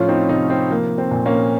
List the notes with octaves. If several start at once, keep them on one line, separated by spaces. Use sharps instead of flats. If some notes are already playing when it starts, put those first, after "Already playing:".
Already playing: A2 F3 C#4 F4
C4 D#4
C3 C4 D#4
C4
F3 A#3
C4
A#2
A#3 C#4